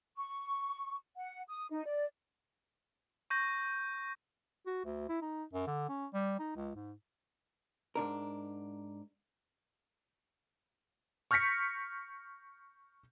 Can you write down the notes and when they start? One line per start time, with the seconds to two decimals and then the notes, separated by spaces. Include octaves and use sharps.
0.17 C#6
1.16 F#5
1.48 D#6
1.71 D#4
1.85 D5
3.30 C#6 G6 A#6
4.66 F#4
4.85 D2
5.09 E4
5.21 D#4
5.53 F#2
5.67 D3
5.89 C#4
6.14 G3
6.39 D#4
6.56 C#2
6.75 G#2
7.96 G#2 D4 A#4
11.31 C#6 F6 G6 A#6 B6 C#7